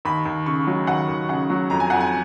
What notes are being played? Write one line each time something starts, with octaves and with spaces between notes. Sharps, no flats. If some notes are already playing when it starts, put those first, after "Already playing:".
D#2 B5
D#2
C#3 C#6
F#3
D#2 F#5
D#2
C#3 F#5
F#3
F2 A#5
G#5
F2 F#5
G#5